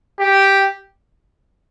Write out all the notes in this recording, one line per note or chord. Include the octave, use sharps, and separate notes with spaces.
G4